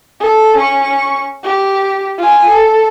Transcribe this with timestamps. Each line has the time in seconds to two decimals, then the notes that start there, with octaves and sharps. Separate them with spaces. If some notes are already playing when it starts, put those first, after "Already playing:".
0.20 A4
0.57 C#4 C#6
1.44 G4
2.18 F4 G#5
2.47 A4